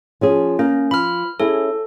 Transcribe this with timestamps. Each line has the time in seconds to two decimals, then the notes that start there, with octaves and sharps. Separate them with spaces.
0.21 F3 C#4 G#4
0.59 A#3 C#4
0.91 F3 B5 F6
1.40 C#4 E4 G#4 A4